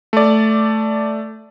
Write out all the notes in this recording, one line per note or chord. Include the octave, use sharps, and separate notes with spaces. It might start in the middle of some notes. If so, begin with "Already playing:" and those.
A3 D5